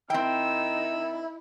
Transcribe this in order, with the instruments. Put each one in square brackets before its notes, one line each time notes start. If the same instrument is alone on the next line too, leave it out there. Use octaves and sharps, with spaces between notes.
[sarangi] D#3 [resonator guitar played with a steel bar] C4 G5 [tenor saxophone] E4 [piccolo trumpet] E6